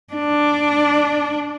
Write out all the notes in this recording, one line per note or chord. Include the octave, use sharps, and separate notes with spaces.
D4